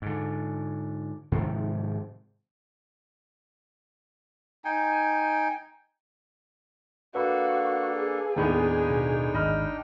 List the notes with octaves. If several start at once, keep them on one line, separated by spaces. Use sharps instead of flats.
G#2 D3
G#2 C3 D#3 F3
D#4 G5 G#5
A#3 D4 F#4 A4 B4 F5 B5
G#4
D#2 A2 B3 D4 D#4 G5
B2
G#1 D#5 B5 F6